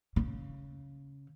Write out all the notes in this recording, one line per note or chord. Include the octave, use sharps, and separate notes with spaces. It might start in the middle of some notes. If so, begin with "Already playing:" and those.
C#3